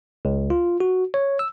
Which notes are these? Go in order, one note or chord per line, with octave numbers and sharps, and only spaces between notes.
C#2
F4
F#4
C#5
E6